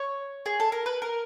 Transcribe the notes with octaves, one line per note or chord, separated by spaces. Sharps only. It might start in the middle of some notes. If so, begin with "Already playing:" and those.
Already playing: C#5
G#4
A4
A#4
B4
A#4